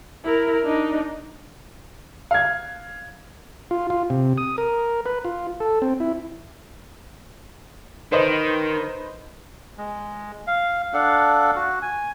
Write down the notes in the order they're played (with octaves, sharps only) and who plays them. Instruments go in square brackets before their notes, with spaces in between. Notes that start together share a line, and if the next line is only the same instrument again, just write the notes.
[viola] E4 A#4
D4 D#4
[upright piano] F5 G#6
[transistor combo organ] F4
F4
C3
D#6
A#4
B4
F4
A4
C4
E4
[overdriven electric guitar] D#3 [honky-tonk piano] B4 C5 D#5
[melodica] G#3
F5
D4 A4 F5 F#5
F#4
G#5